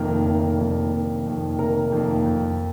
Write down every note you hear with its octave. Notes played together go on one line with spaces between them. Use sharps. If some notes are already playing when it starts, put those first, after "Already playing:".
Already playing: F1 F2 D#3 A#3 A#4
F1
F2 D#3 A#3
F1
F2 D#3 A#3
F1 A#4
F2 D#3 A#3
F2